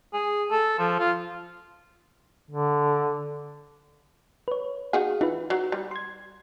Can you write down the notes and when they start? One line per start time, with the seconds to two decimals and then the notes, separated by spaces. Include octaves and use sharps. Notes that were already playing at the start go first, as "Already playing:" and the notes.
0.13 G#4
0.51 A4
0.79 F3
0.99 F4
2.50 D3
4.48 B4 C#5
4.93 D#4 F#4 G#4 F5
5.21 E3 D#4 F4 B4
5.50 F#3
5.72 G3
5.91 C6 G#6